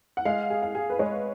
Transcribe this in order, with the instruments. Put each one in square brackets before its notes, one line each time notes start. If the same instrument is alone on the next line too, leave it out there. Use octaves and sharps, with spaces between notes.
[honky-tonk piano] F#5
[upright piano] G#3 [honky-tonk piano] F5
[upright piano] G#4
[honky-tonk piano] F5
[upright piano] G#4
[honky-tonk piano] B4
[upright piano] G#3 [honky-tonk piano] C#5